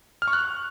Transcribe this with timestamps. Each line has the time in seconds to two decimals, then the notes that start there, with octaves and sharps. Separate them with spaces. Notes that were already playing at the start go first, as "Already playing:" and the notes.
0.22 F6
0.28 C#6
0.33 F#6